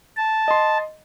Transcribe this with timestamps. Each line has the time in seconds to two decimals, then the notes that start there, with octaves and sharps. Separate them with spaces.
0.17 A5
0.48 D#5 C6